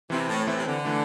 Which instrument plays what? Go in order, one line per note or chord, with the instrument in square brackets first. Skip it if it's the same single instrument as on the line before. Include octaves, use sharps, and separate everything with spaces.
[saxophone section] C3 [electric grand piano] E3 C4 E4
[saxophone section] A2
[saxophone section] A2 [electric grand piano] E3 C4 E4
[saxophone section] C3
D3
[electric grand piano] E3 A3 D4